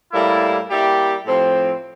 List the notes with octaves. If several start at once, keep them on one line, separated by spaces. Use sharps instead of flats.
A2 G3 A#3 E4
G3 A#3 E4 G4
A2 F3 C4